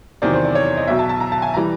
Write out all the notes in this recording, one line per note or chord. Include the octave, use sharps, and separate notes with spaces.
E2 C3 D#3 F#3 D5
C5
D5
C#5
D#5
B1 B2 F#3 E5
A5
A5
A#5
A5
G#5
E3 G3 A#5